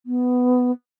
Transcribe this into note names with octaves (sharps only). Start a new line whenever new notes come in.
B3